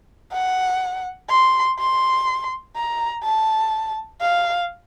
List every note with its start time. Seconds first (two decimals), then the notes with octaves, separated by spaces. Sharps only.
0.32 F#5
1.29 C6
1.79 C6
2.76 A#5
3.24 A5
4.21 F5